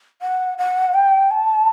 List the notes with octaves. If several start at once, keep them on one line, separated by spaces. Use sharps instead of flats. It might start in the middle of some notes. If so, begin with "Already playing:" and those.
F#5
F#5
G5
A5